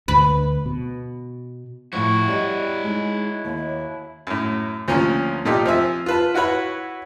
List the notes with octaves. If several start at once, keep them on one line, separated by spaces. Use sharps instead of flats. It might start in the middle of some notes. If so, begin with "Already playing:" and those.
D2 B4
B2
A2 F3 E4 F#4 C#6
G3 C#5 D#5 F#5
G#3 D#4
D#2
F#2 A2
D2 F3 A#3 C#4
A#2 A3 D#4 F4 G4
F3 C4 E5 G#5
F4 B4 A5
E4 F#4 B4 C#5 B5